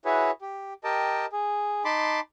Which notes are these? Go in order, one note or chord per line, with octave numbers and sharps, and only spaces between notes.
E4 F#4 G#4 B4 C#5
G4
G4 A#4 D#5 G5 A5
G#4
D#4 A5 B5 C6 D6